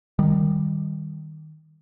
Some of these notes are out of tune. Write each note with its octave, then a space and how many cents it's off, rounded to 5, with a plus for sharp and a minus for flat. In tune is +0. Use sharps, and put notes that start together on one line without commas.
D#3 +0 G3 +0